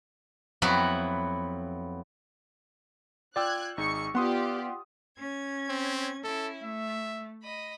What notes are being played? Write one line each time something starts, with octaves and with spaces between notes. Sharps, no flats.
F2 F#3 B3 E4 F#4 B5
F4 D5 G5 E6 F#6 G#6
G#1 D#4 G#4 C#6 C#7
B3 F4 G4 D5 F#5 C6 D#6
C#4 G#6
C4
C#4 E4 A4
A3 E5
D#5 B5